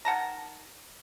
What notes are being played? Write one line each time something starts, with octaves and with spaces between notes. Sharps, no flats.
D#3 F#5 A5 A#5